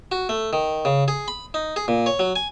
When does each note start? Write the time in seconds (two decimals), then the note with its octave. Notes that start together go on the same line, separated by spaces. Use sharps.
0.12 F#4
0.29 A3
0.53 D#3
0.85 C#3
1.08 G#4
1.28 B5
1.54 D#4
1.76 G#4
1.88 A#2
2.06 C#5
2.19 F#3
2.36 G#5